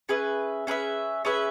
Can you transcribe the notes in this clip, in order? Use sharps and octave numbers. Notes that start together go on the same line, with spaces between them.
C#4 G#4 B4 E5
C#4 G#4 B4 E5
C#4 G#4 B4 E5